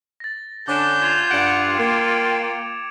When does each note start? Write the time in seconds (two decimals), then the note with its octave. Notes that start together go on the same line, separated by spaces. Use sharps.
0.20 A6 A#6
0.68 D3 C#4 D4 D6 G6 E7
1.02 F4 G#6 E7 F7
1.31 G2 F#5 D7
1.77 A#3 G5 D6 C#7